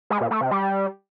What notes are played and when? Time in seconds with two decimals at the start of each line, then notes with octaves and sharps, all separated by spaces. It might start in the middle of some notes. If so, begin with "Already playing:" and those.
0.10 G#3
0.21 A#2
0.31 A3
0.41 C3
0.51 G3